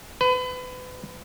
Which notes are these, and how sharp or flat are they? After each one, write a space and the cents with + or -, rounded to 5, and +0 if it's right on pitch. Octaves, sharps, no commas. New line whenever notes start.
B4 +30